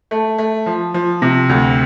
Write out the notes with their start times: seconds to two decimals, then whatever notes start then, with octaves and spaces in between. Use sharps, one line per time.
0.11 A3
0.38 A3
0.66 F3
0.94 F3
1.22 C3
1.49 D2